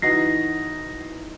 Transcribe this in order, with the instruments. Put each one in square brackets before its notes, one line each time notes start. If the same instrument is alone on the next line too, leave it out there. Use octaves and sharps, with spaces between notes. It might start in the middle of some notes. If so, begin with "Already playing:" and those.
[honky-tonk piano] E3 D#4 F#4 [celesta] A#6 C7